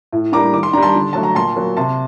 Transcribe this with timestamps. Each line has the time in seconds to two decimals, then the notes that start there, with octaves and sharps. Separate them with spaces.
0.12 A2
0.32 G3 A#3 D4 A#5 D6
0.53 D#3 D6
0.63 C6
0.73 G3 D4 A#5
0.83 A5 C6
0.95 D3
1.13 F#3 A3 A5
1.23 A#5
1.35 A#2 A5 C6
1.56 F#3 A#3
1.77 C3 A5 C6